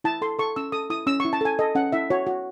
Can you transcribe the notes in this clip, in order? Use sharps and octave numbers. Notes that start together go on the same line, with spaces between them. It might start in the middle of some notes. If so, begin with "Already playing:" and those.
E4 A5
A4 C6
A4 C#6
C#4 E6
A4 D#6
E4 D#6
C#4 E6
E4 C#6
A5
A4 G#5
A4 D#5
C#4 F#5
E4 E5
F#4 C#5
F#4